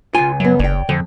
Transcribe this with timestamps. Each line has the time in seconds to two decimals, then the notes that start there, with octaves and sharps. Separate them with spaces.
0.14 C#2 F4 G#5
0.40 F#2 F#3 B3
0.60 F#1 C#5 D5 G5
0.89 F2 D3